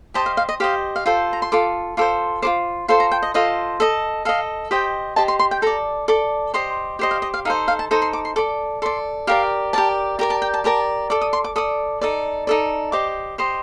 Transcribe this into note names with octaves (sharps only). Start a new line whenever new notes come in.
G4 C5 D#5 A5
F5
F5
D#5
G4 C5 D#5 F5
F5
F4 A4 C5 G5
A#5
C6
F4 A4 D6
F4 A4 C5 D6
F4 A4 C5 D6
F4 A4 C5 C6
A#5
G5
D#5
F4 A4 C5 D#5
A4 D#5
A4 D#5 F5
G4 C5 D#5 G5
G4 C5 D#5 A5
C6
C6
G5
A4 D5 A#5
A4 D5 D6
G4 C5 D#5 C6
G4 C5 D#5 G5
F5
D#5
F5
D#4 A4 C5 F5
F5
A5
D#4 A4 C5 A#5
C6
D6
C6
A4 D5 D6
A4 D5 C6
G4 A#4 D5 F5
G4 A#4 D5 A5
G4 A#4 D5 A#5
A5
G5
A5
G4 A#4 D5 A5
A4 D5 D6
D#6
C6
D6
A4 D5 D#6
D#4 A4 D5
D#4 A4 D5
G4 C5 D#5 D6
G4 C5 D#5 C6